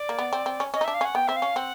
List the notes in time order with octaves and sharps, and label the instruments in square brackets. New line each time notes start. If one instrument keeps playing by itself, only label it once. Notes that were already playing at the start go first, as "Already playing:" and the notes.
Already playing: [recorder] D5
[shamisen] A#3
B3
C4
C4
C#4
[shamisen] C#4 [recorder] D#5
[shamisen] D#4
[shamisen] D4 [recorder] E5
[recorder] F5
[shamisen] C#4 [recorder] F#5
[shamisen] B3 [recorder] G5
[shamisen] C4 [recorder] E5
[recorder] F5
[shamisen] C#4
[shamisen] C4 [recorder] F#5